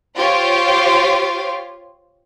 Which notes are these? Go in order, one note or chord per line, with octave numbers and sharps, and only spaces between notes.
F4 G4 C5 C#5 F5